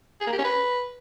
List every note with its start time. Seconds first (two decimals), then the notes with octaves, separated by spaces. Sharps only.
0.21 G#4
0.27 A#3
0.32 G4
0.38 C#4
0.44 B4